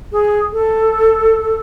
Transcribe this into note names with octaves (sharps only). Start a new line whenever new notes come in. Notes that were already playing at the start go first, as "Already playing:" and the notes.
G#4
A4